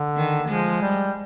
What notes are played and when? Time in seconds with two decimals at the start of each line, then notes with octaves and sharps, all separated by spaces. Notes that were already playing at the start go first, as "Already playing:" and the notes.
Already playing: D3
0.16 D#3
0.48 F3 G#3
0.82 G3